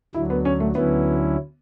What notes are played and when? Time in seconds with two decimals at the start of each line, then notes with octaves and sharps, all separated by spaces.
0.14 D2 D3 F#3 E4
0.30 B3
0.45 C#4
0.60 A3
0.75 D2 D3 F#3 B3 C#4 E4